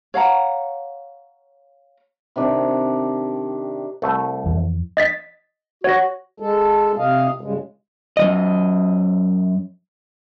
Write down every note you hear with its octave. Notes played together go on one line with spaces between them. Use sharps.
C#5 F5 F#5 A#5
C3 D#3 D4
C2 A3
F2 E3
D#5 A6 B6
F#4 C#5 A#6
G#3 A4
C3 D#5 F5
G2 C#3 G#3
F#2 E3 D#5